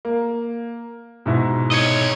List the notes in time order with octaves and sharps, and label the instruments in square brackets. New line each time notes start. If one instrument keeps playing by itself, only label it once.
[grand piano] A#3
G#2 B2 E4
[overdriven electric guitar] C#5 D#5